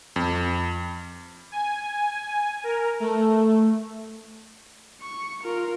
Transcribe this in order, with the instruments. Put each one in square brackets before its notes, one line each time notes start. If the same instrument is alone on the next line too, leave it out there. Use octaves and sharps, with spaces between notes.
[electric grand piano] F2
[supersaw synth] G#5
A#4
A3
[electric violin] C#6
F4 A#4